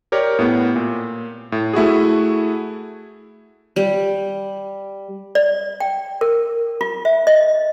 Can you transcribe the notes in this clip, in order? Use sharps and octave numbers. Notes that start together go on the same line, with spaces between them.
G4 A#4 C#5 D5
A2 B3
A#2
A2
A3 E4 F#4 G#4
G3
D5
G5
A#4
F4
E5
D#5